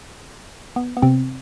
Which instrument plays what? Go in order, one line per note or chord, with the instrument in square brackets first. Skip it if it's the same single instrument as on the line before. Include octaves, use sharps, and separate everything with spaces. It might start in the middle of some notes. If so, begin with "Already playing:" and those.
[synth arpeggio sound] B3
B3
C3 C4